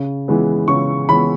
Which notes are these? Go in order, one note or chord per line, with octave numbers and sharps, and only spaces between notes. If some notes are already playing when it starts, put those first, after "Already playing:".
Already playing: C#3
E3 G#3 B3
C#3 C#6
E3 G#3 B3 B5